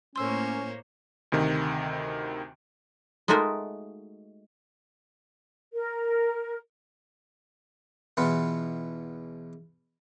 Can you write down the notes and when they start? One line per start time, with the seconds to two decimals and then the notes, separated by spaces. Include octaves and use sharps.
0.16 A2 A#3 C#4 C5 C#5 C6 E6
1.32 D2 C3 D#3
3.28 G#3 A3 D#4 F4 F#4 A#4
5.74 A#4
8.17 E2 B2 E3 F4 B4 F#5